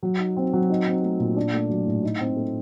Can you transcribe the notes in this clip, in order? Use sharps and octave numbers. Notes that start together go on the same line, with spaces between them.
F#3
D#4
C4
F#3
D#4
C4
A3
A#2
D4
A3
F#3
A2
D#4
C4
A3